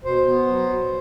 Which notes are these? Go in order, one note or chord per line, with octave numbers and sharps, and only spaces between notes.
B2 C5
B3
F#3
B2